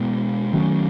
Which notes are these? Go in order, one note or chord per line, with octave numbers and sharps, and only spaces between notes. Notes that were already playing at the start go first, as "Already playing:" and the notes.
Already playing: B2 G#3 B3
D#3 F#3 A3 C#4